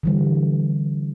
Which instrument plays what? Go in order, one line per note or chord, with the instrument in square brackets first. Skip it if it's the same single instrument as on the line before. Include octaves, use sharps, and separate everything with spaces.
[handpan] D3 E3 G3